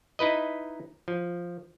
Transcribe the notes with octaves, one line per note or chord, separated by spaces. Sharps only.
D#4 E4 B4 D#5
F3